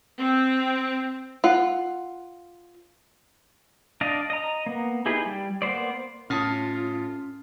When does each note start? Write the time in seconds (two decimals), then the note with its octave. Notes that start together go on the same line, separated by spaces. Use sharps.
0.18 C4
1.44 F4 F#5
4.01 D4 D5 D#5 F5
4.30 D#5 A#5
4.66 A#3 B3
5.06 D#4 E4 G4 G#4 B4
5.26 G3
5.62 A#3 B3 C5 D5
6.30 A2 C#4 F4 A5 D#6 F6